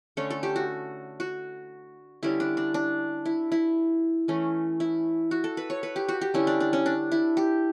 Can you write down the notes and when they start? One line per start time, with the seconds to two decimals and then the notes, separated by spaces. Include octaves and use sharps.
0.17 D3 A3 C#4 C#5
0.30 A4
0.43 G4
0.56 F#4
1.20 F#4
2.23 D3 G3 C#4 E4
2.40 D4
2.57 D4
2.74 D4
3.25 E4
3.52 E4
4.28 E3 A3 C#4
4.80 E4
5.31 F#4
5.44 A4
5.57 B4
5.70 C#5
5.83 B4
5.96 G4
6.08 F#4
6.21 G4
6.34 D3 G3 C#4 E4
6.47 D4
6.60 D4
6.73 C#4
6.86 D4
7.12 E4
7.37 G4